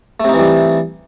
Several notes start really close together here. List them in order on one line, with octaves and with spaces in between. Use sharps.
A3 C3 D#4 E3 G3